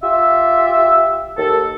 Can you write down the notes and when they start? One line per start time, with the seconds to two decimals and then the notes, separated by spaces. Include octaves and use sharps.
0.03 F4 G4 E5
1.38 D#2 A4